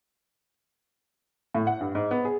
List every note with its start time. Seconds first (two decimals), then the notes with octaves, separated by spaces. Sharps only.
1.54 A2
1.67 F#5
1.81 G2
1.95 G#2
2.11 B3
2.25 G#4